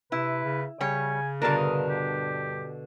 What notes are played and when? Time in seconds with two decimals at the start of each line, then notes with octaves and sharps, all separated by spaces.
0.12 C3 E4 B4
0.44 C#3
0.81 C#3 G3 C#5 G#5
1.42 G2 B2 D3 D4 A#4 A5
1.57 D#6
1.89 G4